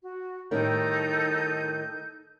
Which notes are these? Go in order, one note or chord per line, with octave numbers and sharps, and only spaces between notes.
F#4
A2 D#3 G3 D#4 A4 G6